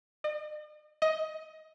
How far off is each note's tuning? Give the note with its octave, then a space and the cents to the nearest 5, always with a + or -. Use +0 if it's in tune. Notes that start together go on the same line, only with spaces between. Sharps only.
D#5 -45
D#5 +15